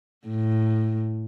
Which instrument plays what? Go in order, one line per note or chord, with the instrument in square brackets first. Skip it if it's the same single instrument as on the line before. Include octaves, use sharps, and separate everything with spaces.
[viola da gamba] A2